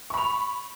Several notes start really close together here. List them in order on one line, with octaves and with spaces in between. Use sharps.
C#6 B5 F7